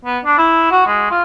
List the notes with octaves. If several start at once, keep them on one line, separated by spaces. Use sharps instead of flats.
B3
D4
E4
F#4
G#3
F4